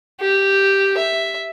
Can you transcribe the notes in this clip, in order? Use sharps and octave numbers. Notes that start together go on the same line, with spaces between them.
G4
E5